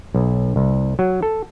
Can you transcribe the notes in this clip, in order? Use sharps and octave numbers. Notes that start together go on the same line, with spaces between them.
B1
C2
F#3
A4